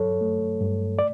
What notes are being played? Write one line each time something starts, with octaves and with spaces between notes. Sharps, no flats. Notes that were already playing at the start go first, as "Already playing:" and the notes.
Already playing: G2 F#3 A4 C#5
A3
G2
D5